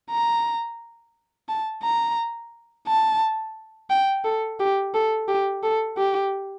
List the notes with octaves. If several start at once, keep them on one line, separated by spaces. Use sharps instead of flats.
A#5
A5
A#5
A5
G5
A4
G4
A4
G4
A4
G4